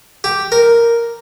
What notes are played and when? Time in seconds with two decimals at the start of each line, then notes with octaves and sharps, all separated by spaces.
0.24 G4
0.52 A#4